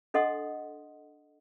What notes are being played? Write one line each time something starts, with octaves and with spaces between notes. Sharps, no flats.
D4 A4 D#5 F#5 C6 D#6